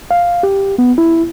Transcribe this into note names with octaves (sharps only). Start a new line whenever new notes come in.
F5
G4
B3
E4